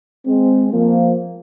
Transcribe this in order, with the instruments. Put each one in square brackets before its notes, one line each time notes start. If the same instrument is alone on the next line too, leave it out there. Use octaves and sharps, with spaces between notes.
[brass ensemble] G#3 C4
F3 A#3